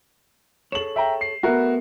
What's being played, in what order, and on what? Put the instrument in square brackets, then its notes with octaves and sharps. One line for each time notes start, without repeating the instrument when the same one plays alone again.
[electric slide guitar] G#4 A4 C#5 [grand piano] E7 F#7
[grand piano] E5 G5 A#5
C7
[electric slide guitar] A3 B3 [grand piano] F#4 A#4 E5